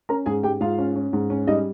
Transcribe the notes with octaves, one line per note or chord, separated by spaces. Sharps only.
C#4 A#4 A#5
G#2 G#4 G#5
G#2 G4 G5
G#2 F4 F5
C#4
C#4
G#2
C#4
G3 D#4 D#5